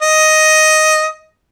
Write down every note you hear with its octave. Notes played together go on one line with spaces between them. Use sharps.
D#5